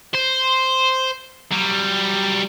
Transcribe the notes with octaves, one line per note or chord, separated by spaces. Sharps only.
C5
F#3 G3